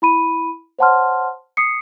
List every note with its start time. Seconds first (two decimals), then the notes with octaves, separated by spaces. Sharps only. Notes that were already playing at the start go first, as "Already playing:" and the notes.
0.02 E4 B5 D#7
0.79 C5 C#5 F#5 A5 C6 F6
1.57 D#6 C7 C#7